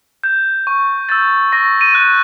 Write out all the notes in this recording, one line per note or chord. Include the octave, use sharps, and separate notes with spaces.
G6
C#6
E6 G6 A6
C#6 A#6
D#7
F#6